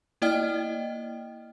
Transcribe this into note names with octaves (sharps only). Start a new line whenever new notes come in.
A#3 E4 D5 D#5 G5 F6